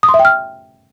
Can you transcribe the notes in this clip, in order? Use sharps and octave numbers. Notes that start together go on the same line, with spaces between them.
D#6
C6
E5
G5
F6